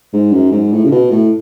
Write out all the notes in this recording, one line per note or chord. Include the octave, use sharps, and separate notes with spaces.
G#2
F#2
G#2
A2
C#3
B2
A2